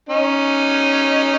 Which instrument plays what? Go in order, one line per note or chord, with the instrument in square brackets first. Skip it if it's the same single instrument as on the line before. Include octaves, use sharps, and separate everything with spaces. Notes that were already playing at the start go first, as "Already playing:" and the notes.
[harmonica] C#4 D#4